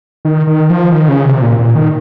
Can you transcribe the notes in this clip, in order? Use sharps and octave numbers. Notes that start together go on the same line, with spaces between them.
D#3
D#3
F3
D#3
C#3
C3
A#2
A#2
D#3